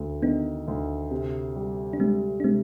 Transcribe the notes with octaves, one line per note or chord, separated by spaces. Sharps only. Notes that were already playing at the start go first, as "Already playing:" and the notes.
Already playing: D2
D#3 B3 D4
D2
C3
G3
D4
G3 G#3 C4
D4
C3 G#3 C4